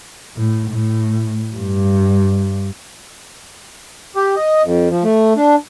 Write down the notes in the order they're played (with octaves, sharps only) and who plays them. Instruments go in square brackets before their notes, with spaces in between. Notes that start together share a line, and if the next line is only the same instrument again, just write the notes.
[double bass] A2
A2
G2
[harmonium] G4
D#5
F2
F3
A3
D4